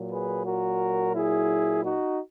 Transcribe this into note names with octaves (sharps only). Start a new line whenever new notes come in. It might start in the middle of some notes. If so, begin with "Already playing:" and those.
Already playing: A#2 F#3
G#4 B4
F#4 A#4
E4 G#4
D#4 F#4